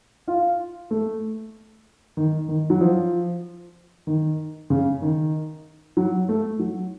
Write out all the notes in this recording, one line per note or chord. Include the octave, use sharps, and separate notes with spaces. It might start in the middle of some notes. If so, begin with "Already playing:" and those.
F4
A3
D#3
D#3
F#3
F3
D#3
C#3
D#3
F#3
A3
F#3